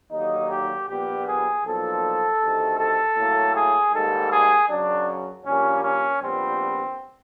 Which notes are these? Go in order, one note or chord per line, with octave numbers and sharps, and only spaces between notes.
D#2 D3 F#3 A#3 D#4
G4
A#1 A#2 G3 B3 G4
G#4
B1 A#2 F3 A4
D2 C3 D#3
A4
A2 F#3 A#3
G#4
G#2 D#3 G3 A#3 A4
G#4
F#2 C#3 F#3 D4
A#1 A#2 G3 A#3 C#4
C#4
A#1 A#2 G3 B3 C4